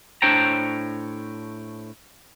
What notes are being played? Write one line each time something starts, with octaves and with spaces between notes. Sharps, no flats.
A2 D4 C5 C#5 G5 A#5